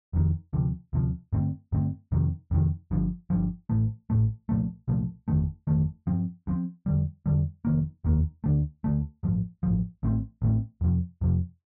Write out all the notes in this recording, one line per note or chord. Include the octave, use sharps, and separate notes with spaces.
F1 F2 D#3
D2 C3 F3
D2 C3 F3
G2 D3 A3 C4
G2 D3 A3 C4
F2 C3 D#3
F2 C3 D#3
G1 G2 F3
G1 G2 F3
A1 A2 A3
A1 A2 A3
C2 A#2 F3 A3
C2 A#2 F3 A3
G1 F2 D#3 A3
G1 F2 D#3 A3
G2 F3 C4
G2 F3 C4
F2 D3 G3
F2 D3 G3
F1 D#2 D#3 A#3
F1 D#2 D#3 A#3
D2 D3 A3
D2 D3 A3
A1 G2 F3
A1 G2 F3
A1 A2 A3 C4
A1 A2 A3 C4
F2 C3 F3
F2 C3 F3